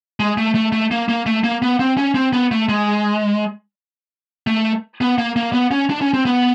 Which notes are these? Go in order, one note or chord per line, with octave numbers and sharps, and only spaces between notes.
G#3
A3
A3
A3
A#3
A#3
A3
A#3
B3
C4
C#4
C4
B3
A3
G#3
A3
B3
A#3
A#3
B3
C#4
D4
C#4
C4
B3